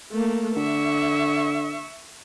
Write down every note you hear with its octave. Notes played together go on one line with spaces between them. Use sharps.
A3 A#3
D3 E5 C#6